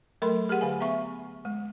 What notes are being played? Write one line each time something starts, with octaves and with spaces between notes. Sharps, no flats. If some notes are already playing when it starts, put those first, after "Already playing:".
F#3 A3 A4 A#4 B5 C6
G4 G#4 A#4 F#5
D3 F5 G#5
B3 E5 C#6
G#3